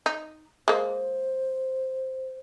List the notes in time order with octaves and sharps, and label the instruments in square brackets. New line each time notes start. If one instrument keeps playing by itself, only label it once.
[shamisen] D#4
[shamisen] G#3 A#3 [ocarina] C5